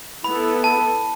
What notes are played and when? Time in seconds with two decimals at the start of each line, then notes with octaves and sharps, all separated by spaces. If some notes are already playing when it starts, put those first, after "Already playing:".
0.24 B3 E4 A4 B5
0.64 A5